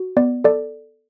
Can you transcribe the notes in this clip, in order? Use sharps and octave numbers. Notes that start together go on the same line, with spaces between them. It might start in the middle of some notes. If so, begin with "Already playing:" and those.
Already playing: F#4
B3 D5
A4 D5